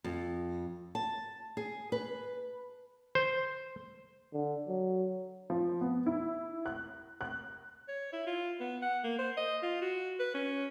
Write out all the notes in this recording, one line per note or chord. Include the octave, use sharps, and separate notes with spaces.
F2
A5
G#4
B4
C5
D3
F#3
F3
B3
E4
F#6
F#6
C#5
E4
F4
B3
F#5
A#3
C5
D#5
F4
F#4
B4
C#4